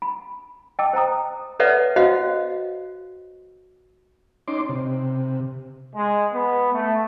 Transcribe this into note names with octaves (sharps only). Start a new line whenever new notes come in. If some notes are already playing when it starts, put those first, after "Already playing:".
B5
D#5 G5 A5 D6 E6
C5 G5 A#5 D#6
A4 B4 C#5 D5 E5 F#5
F#4 C5 D#5 F5 F#5
C#4 D#4 C6 D6
C3
G#3
B3
A3